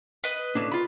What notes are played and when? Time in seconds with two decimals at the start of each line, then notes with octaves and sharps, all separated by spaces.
0.24 B4 D#5
0.55 A2 A#3 D4
0.71 F4 B5